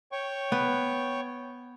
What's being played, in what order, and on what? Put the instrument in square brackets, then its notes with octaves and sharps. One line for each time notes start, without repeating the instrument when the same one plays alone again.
[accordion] C#5 G5 C#6
[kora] B3